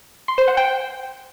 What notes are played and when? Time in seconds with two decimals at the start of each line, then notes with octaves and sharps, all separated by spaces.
0.28 C6
0.38 C5
0.48 F#5
0.57 G5